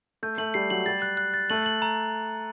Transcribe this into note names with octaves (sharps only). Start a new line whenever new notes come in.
A3 G6
A3 F#7
G3 C7
F#3 F#7
G3 A6
F#6
F#6
A6
A3 F#7
F#7
A#5